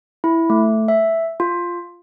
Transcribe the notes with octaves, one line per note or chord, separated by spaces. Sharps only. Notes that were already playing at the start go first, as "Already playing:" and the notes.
E4
A3
E5
F4